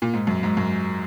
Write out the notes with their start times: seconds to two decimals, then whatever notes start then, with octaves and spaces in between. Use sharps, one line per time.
0.02 A#2
0.13 G#2
0.27 F#2
0.43 G#2
0.57 F#2